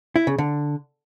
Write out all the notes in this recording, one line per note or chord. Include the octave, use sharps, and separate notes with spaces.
E4
C#3
D3